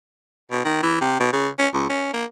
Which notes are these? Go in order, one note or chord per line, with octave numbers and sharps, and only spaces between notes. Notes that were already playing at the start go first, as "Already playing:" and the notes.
B2
D#3
E3
C3
B2
C#3
C#4
C#2
C#4
A#3